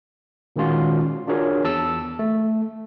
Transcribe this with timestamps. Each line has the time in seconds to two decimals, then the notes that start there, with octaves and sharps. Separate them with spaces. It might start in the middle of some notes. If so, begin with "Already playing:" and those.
0.56 A#2 D#3 G#3 C#4 F4 F#4
1.27 D4 F4 F#4 G#4 A#4 C#5
1.64 E2 A5 E6
2.19 A3